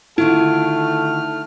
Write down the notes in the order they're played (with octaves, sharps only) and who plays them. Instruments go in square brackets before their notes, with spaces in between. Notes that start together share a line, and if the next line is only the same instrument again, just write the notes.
[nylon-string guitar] D3 D#3 F4 [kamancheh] A3 [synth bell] E4 [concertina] F6